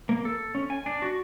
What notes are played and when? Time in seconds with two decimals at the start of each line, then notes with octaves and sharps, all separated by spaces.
0.09 A#3
0.25 A4
0.55 C#4
0.70 G#5
0.86 D4
1.02 F#4